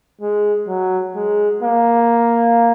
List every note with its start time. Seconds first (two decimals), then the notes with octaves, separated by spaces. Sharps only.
0.21 G#3
0.68 F#3
1.16 G#3
1.63 A#3